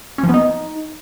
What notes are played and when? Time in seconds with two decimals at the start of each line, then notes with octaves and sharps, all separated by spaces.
0.18 C#4
0.23 F3
0.29 B3
0.34 D#4